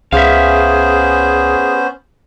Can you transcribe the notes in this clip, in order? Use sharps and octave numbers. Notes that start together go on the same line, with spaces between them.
C#2 B3 C#4 G#4 C5 E5 F5